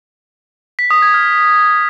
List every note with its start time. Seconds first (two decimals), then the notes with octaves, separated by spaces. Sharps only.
0.79 B6
0.91 D#6
1.02 G#6
1.14 F6